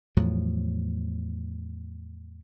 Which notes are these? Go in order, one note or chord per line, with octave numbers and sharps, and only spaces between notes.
E2 A2 F3 F#3